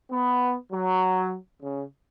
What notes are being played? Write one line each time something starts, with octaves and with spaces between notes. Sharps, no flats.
B3
F#3
C#3